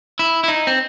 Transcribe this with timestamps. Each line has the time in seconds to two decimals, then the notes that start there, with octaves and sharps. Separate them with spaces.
0.19 E4
0.44 E4
0.48 D#4
0.67 C4